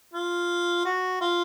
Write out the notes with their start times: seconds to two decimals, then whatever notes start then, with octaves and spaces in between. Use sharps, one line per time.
0.14 F4
0.85 F#4
1.21 F4